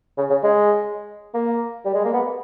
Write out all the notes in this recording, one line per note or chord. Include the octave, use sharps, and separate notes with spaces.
C#3
C#3
G#3
A#3
G3
G#3
A#3
B3